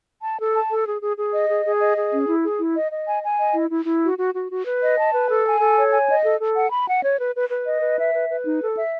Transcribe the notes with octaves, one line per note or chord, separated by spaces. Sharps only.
A5
A4
A5
A4
G#4
G#4
G#4
D#5
G#4
G#4
D#5
G#4
C#4
E4
G#4
E4
D#5
D#5
G#5
G#5
D#5
E4
E4
E4
F#4
F#4
F#4
F#4
B4
D#5
A5
B4
A4
G#5
A4
C#5
G#5
D#5
A4
A4
F#5
B5
F#5
C#5
B4
B4
B4
D#5
B4
E5
B4
B4
D#4
A4
E5